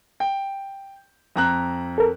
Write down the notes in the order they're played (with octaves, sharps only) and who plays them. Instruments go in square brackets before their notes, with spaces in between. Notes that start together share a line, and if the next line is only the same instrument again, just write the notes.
[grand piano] G5
F2 A#5 F#6
[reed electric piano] A4 A#4